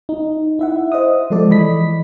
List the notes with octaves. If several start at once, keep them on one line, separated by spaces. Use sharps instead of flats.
D#4
E4 E5 F#5
C5 D#5 E5 F#5 D#6
F3 G#3 A4 D5
E3 D#5 B5 B6